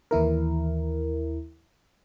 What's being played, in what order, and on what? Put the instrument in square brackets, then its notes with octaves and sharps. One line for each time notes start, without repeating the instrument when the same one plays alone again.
[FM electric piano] D#2 E3 E4 A#4